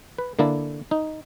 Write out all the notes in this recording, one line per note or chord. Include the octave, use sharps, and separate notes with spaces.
B4
D3 A#3 D4 E4 A4
D#4